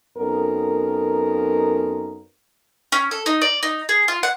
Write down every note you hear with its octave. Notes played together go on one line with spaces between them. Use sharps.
F#2 B3 C4 D#4 A4 A#4
C#4
A4
D#4
D5
D#4
G#4
F4
F#5